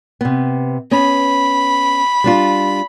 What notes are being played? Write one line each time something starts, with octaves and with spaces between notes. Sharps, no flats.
C3 B3
B3 C#4 B5
G3 D4 F4